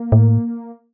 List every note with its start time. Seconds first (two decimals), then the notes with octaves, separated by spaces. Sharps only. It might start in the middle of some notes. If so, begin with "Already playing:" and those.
Already playing: A#3
0.12 A2